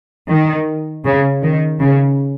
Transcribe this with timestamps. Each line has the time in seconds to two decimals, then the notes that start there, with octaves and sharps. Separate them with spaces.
0.30 D#3
1.05 C#3
1.43 D#3
1.80 C#3